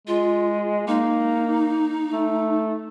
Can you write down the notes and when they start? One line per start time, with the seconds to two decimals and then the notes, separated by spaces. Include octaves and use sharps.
0.07 G#3 F4
0.88 A#3 D#4
2.13 A3